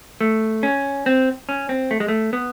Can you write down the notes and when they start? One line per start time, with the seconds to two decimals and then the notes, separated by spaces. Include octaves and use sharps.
0.21 A3
0.63 C#4
1.06 C4
1.49 C#4
1.69 C4
1.91 A3
2.00 G#3
2.08 A3
2.33 B3